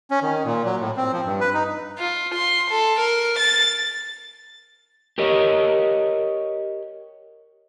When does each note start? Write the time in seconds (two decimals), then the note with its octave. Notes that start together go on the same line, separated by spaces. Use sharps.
0.11 C#4
0.22 D#3
0.46 A#2
0.65 F#3
0.80 A2
0.97 C4
1.13 F3
1.25 G2
1.41 B4
1.54 D#4
1.98 F4
2.34 C6
2.71 A4
3.00 A#4
3.39 A6
5.18 G4 A#4 C#5 D#5